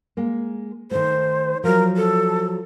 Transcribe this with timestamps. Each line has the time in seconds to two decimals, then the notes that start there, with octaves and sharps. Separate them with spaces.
0.17 G#3 A#3
0.91 D#3 A3 C5
1.64 F3 F#3 A#4
1.97 A4